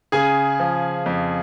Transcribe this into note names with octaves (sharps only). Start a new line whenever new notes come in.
C#3 G#4 G#5
F3
F2